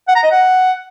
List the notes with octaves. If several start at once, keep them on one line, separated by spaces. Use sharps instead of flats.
F#5
A#5
D#5
F#5